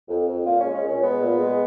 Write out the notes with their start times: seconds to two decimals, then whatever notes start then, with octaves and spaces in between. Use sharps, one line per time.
0.08 F2
0.27 F2
0.46 A#2 F4
0.60 G#3 C#4
0.74 C#4
0.83 A#2
0.88 C#4
1.02 G#3 B3
1.20 A#2
1.39 G#3